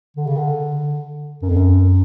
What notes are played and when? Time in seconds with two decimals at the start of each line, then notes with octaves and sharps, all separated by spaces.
0.17 D3
0.27 C#3
0.38 D3
1.42 F#2
1.49 F2
1.57 F#2